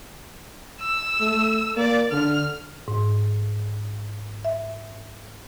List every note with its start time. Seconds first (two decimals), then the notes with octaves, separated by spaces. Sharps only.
0.81 E6
1.21 A3
1.77 A#3 D5
2.12 D3 F6
2.88 G#2
4.45 E5